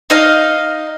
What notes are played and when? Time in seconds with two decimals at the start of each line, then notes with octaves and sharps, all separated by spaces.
0.10 D#4 D#5 F5